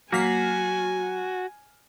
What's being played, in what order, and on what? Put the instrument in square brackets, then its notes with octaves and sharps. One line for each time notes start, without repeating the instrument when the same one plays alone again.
[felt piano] F#3 F6 [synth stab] A#3 B6 C7 [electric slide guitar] F#4 [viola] G#5